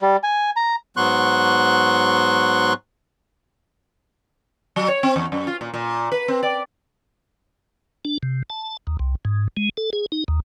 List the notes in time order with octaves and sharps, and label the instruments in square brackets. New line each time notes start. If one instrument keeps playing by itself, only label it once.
[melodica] G3
G#5
A#5
[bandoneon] G#2 F#3 B3 C6 C#6 F#6
[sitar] F#3
C#5
C4
E2
F#2
F4
A#2
A#2
B4
C4
D5
[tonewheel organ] D4
C3
A5
D#2
C2
G#2
G#3
A4
G#4
D#4
D#2